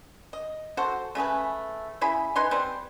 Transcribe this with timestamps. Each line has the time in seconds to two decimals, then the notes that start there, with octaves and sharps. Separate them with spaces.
0.33 D#5
0.77 F#4 A4 C5
1.15 C#3 A3 G#4 B4
2.01 C#3 E4 G#4 B5
2.36 D#4 B4 G#5 C6
2.51 G3 C4 B4 C5